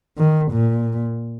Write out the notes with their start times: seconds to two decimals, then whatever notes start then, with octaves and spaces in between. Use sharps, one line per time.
0.18 D#3
0.52 A#2